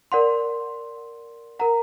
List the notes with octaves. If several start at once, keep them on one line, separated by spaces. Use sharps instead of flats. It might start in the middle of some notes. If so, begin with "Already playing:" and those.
A#4 D5 F#5 C6
A#4 F#5 A#5